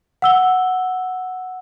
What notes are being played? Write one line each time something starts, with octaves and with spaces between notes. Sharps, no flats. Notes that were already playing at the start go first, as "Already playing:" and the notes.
F#5 E6 G7